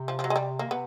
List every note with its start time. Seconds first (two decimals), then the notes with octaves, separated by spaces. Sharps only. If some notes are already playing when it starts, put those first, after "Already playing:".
Already playing: C3
0.08 F3
0.19 F3
0.24 F#3
0.30 G#3
0.36 G3
0.59 A#3
0.66 C#3
0.71 C3 B3